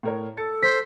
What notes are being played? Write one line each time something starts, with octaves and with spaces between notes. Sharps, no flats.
A2 A#4 C#5
A4 A5 A6 C#7
C5 B6